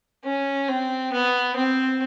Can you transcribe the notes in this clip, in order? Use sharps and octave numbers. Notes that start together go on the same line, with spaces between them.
C#4
C4
B3
C4